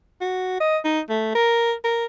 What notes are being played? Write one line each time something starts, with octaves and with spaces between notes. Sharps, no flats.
F#4
D#5
D#4
A3
A#4
A#4